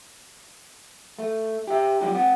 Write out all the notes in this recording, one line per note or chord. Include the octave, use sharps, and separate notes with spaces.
A3
G4 E5
F#3 G#3 F4 G4
C4 F#5